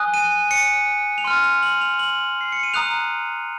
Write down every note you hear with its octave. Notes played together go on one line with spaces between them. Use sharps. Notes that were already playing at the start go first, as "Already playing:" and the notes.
Already playing: G#5 D#6 F#6
D#7
C#7
F7
C6 F6 D#7
F7
F#7
F7
F#7
C7
C#7
D#7
A#5 D#6 F#6 F7